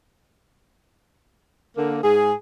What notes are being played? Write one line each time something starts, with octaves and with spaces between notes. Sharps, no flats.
D3 A#3
G#2 G#4